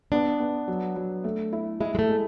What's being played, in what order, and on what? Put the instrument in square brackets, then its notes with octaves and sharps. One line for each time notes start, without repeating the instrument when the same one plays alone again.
[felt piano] B3 [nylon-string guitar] D4
[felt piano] B3
F#3
F#3
A3
E4
[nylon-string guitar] G#3 [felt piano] E4
[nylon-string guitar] G#3
A3
[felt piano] G#3